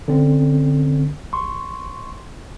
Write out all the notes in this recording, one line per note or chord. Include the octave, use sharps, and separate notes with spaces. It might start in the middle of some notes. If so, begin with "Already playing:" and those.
D3 C4 C#4
A1 C6 C#6